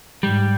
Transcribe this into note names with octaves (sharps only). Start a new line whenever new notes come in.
G#2 G3